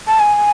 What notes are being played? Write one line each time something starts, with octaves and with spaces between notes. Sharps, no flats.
A5
G#5